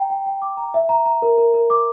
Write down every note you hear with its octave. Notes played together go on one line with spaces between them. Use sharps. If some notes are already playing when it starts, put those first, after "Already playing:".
Already playing: G5 A#5
G5
G5
D6
A#5
E5
A#5
A#5
A#4
A#4
A#4
D6